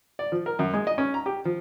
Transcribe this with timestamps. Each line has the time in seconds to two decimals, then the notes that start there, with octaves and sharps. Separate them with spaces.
0.19 D5
0.32 F3
0.46 A#4
0.59 F#2
0.74 G#3
0.87 D#5
0.98 C#4
1.14 A#5
1.26 G4
1.45 F3